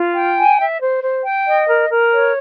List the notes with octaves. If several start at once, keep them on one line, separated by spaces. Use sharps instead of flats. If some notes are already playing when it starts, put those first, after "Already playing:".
Already playing: F4
G5
G#5
E5
C5
C5
G5
D#5
A#4
A#4
C#5